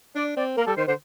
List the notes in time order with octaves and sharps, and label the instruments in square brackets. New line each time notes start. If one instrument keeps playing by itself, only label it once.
[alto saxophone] D4 [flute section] D5
[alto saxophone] C4 [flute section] D5
[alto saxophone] A#3 [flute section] A#4
[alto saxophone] G3 [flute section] A4
[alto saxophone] D#3 [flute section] C5
[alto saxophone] D3 [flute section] C5